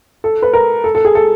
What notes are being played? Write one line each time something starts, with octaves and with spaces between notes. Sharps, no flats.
A4
B4
A#4
A4
A4
G#4
A4